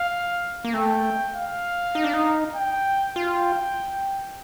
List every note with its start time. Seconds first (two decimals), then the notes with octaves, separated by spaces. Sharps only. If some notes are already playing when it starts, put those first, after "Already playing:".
Already playing: F5
0.64 A#3
0.74 A3 G5
1.35 F5
1.95 D#4
2.04 D4
2.13 D#4
2.55 G5
3.16 F4 G5